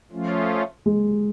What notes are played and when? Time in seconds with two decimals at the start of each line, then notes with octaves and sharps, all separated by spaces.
0.12 F3 A3 C#4 F4
0.86 G#3